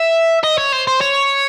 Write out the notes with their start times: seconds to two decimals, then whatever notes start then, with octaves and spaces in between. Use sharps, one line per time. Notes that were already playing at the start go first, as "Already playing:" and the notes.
Already playing: E5
0.44 D#5
0.58 C#5
0.72 C5
0.87 C5
1.01 C#5